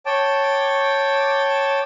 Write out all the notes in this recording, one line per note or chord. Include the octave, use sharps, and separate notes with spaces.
C#5 G5 A5 D6